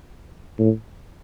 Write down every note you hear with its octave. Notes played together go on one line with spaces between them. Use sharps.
A2